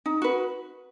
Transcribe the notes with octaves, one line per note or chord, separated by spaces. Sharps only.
D#4
F#4 B4